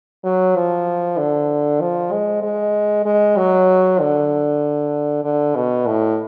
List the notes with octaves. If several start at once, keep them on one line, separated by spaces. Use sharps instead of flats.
F#3
F3
D3
F3
G#3
G#3
G#3
F#3
D3
D3
B2
A2